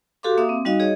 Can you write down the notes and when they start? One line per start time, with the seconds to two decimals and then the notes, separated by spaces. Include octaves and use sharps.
0.23 F#4 G4 A4 F5 C6 D6
0.37 A#3 E5 F5 D6 D#6
0.49 C4
0.65 G3 D#4 F#4 D#5 F5
0.80 G#4 C#5 D#5